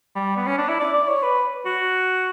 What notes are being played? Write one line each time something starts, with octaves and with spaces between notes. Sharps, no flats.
G3
B3
C#4
D4
E4
D5
D5
C#5
B4
F#4